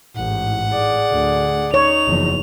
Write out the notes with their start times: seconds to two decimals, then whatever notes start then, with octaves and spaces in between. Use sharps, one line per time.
0.16 A1 G#2 F#5
0.71 G#4 D5
1.10 D2
1.74 D#4 C#5 F7
2.07 F#1 E2 F3